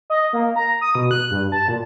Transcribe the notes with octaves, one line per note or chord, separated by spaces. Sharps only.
D#5
A#3
A#5
D#6
B2
F#6
G2
A5
A#2